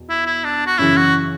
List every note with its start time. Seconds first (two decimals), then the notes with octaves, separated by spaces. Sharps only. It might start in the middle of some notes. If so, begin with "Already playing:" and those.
Already playing: E2 B2
0.09 E4
0.26 E4
0.44 D4
0.67 F#4
0.78 F#2 C#3 E3 E4
0.97 F#4